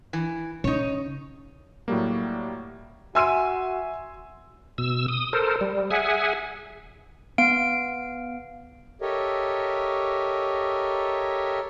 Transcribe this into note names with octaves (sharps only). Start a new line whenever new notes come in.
E3
C#3 D#4 C#5
A2 F#3 G3 A#3
F#4 E5 G#5 C6 E6 D#7
B2 E6
D#6
A4 A#4 C5
G3
G#4 E5 F#5 G#5
B3 F5 D7
G4 A4 A#4 C#5 D#5 E5